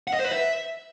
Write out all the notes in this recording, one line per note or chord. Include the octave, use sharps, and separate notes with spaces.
F#5
D#5
C5
B4
E5